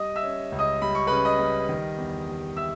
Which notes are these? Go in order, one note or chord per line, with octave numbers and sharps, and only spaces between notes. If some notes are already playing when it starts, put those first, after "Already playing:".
Already playing: G3 D#5 D#6
E5 E6
C#4
C#2
D#5 D#6
G3 B5
C#6
C#3 B4 B5
D#5 D#6
G3
D#3
E2
G3
E5 E6